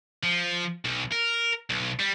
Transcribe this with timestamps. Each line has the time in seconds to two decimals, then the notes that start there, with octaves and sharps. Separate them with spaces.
0.24 F3
0.85 B1
1.12 A#4
1.69 B1
2.00 G3